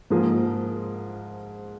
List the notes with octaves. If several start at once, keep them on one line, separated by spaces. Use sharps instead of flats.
G#2 F3 A#3 F4 G#4